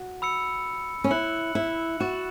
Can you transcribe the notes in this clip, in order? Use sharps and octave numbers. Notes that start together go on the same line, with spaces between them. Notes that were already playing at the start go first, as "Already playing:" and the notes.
Already playing: F#4
B5 E6 C#7
C#4
E4 F#6 C#7 F#7
E4
F#4 C#6 A6 E7